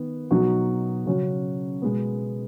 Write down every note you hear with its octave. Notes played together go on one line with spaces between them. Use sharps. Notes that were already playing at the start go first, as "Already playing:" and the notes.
Already playing: D#3 B3
B2 F#3 D#4 F#4
C#3 F#3 C#4 F#4
B2 G#3 B3